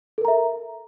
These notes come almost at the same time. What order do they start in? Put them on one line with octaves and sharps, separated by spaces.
A4 A#4 A#5 E5